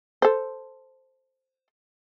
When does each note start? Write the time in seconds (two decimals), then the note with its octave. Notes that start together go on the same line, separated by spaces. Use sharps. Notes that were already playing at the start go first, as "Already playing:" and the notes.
0.22 A4 C5